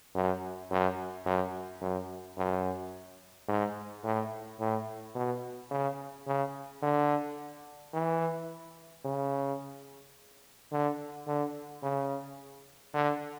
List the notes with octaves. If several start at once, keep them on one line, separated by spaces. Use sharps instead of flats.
F#2
F#2
F#2
F#2
F#2
G#2
A2
A2
B2
C#3
C#3
D3
E3
C#3
D3
D3
C#3
D3